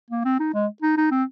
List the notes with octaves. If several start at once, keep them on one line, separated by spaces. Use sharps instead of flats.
A#3
C4
D#4
G#3
D#4
D#4
C4